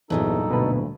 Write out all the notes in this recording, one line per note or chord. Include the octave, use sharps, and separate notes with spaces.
E2 G2 A#2 F#3 D#4 A4
D2 B2 B4